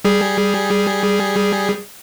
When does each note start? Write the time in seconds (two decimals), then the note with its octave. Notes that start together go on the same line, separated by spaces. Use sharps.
0.05 G3 G#4